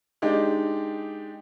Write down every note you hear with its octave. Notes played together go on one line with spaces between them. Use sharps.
G#3 D4 D#4 G4